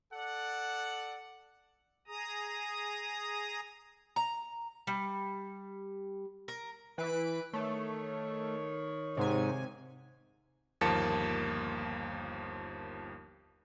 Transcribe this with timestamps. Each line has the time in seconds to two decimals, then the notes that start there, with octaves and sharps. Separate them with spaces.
0.14 A4 D5 F#5
2.08 G#4 A#5 D#6
4.16 A#5
4.87 G3
6.48 A#4
6.98 E3 B4 B6 D7
7.53 D#3 A3 C#5
9.17 G#2 C3 G#5
10.81 G1 D#2 F3 A#3 A5 C#7